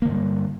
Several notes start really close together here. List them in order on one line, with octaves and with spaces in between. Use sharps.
A#3 D3 G2 G3